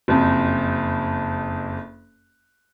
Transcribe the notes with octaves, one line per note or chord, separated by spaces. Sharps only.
F#1 F2